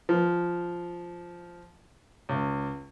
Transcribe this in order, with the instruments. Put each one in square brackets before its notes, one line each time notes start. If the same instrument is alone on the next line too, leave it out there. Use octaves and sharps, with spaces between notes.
[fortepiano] F3
C#2